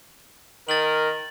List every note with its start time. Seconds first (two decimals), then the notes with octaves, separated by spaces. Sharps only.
0.69 D#3 A#4 A6 F#7